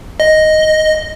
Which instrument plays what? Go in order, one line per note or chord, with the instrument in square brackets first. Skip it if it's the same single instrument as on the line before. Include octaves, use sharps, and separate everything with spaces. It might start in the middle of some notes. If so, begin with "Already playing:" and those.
[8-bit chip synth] D#5